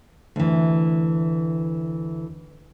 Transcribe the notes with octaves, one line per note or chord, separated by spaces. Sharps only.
D2 E3